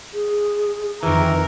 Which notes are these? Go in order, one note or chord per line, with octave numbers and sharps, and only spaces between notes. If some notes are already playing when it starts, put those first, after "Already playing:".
G#4
F2 D#3 E3 A#4